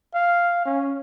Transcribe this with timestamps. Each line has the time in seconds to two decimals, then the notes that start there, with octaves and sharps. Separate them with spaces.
0.14 F5
0.65 C#4